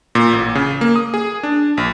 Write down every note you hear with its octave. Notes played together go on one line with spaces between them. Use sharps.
A#2
A1
C#3
A#3
D#6
G#4
D4
A#1